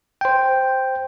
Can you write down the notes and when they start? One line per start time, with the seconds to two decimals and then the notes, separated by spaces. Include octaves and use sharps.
0.21 C5 G5